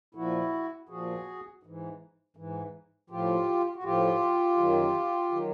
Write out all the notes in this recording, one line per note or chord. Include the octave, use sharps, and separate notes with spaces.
A#2 F3 E4 F#4
A#2 F3 F#4 G#4
G#2 E3
G#2 E3
A2 F3 F4 G4
F#4
A2 F3 F4 G4
F#2 D#3 F#3
D#3 F#3